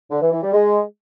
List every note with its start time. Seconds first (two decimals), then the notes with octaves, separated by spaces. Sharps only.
0.11 D3
0.22 E3
0.32 E3
0.43 G3
0.53 G#3